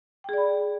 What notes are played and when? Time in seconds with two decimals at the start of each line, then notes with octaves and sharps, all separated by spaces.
0.24 G5
0.29 G#4
0.33 D5
0.38 B5